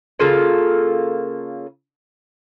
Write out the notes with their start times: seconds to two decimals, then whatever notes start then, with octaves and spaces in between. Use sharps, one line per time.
0.19 C#3 A#3 F4 A4